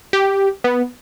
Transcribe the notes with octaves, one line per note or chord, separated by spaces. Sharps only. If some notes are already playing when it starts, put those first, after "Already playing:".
G4
B3